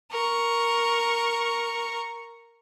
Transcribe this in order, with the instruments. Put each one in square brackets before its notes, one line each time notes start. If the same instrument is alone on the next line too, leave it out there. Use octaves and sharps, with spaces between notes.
[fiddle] A#4 C#6